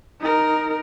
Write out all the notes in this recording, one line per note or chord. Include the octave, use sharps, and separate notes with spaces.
D#4 A#4